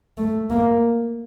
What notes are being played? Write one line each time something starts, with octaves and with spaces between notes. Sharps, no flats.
A3
A#3